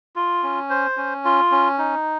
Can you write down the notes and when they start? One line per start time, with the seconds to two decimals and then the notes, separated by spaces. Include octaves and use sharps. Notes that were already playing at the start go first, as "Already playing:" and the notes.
0.16 F4
0.43 C#4
0.70 C5
0.97 C#4
1.25 F4
1.51 C#4
1.79 D#4